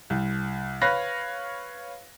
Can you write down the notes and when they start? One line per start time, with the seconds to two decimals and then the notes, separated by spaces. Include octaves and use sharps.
0.10 C2
0.82 B4 C#5 F5 B5 F#6 A#6